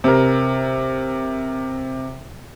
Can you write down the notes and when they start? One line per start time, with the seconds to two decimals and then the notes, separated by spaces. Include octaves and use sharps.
0.04 C3 A#4